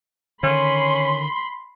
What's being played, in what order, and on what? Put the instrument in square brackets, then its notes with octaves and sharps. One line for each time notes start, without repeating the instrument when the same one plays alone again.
[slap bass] D3 D#3 [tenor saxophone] C#4 [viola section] B5 C6